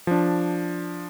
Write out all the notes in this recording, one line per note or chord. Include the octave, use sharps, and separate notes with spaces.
F3 D4